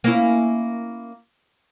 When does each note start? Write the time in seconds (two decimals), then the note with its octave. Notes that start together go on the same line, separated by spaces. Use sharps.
0.04 A#3 C#4 E4